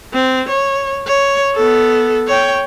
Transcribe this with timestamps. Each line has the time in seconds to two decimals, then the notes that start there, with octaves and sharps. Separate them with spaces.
0.14 C4
0.49 C#5
1.07 C#5
1.55 B3 A4
2.27 C#5 G5